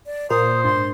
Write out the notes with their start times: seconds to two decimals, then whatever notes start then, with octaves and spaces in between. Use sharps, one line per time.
0.06 D5
0.30 A#2 A#4 C5 D#6
0.64 G#2 D4 C6